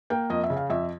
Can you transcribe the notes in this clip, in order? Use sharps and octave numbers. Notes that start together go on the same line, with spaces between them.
A#3 G5
F2 D#5
E5
C#3
F5
F2 E5